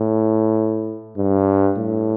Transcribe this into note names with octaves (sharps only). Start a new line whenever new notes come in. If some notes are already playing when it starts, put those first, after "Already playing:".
Already playing: A2
G2
A2